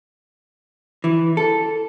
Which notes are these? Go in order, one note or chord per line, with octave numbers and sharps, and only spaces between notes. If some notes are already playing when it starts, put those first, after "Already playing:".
E3
A4